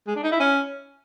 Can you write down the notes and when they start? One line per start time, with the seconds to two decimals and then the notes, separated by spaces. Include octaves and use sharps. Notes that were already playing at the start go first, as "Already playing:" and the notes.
0.07 G#3
0.15 D4
0.23 D#4
0.31 E4
0.39 C#4